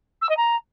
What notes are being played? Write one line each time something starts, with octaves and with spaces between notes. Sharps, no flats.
E6
D#5
A#5